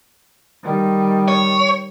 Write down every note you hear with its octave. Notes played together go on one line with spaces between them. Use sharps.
D#3 G3
C#5